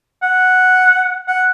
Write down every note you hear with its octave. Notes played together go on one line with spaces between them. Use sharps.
F#5
F#5